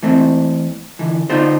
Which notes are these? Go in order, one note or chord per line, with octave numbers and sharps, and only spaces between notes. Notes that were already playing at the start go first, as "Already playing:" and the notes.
E3 A3 C4
D3 E3
D3 B3 D#4 F4 A4 C5